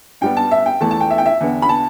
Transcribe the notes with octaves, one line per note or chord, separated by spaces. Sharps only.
G2 G3 B3 G5
A5
E5
G5
E2 E3 A3 A5
A5
G5
E5
G5
E5
E2 D3 B3
B5
A5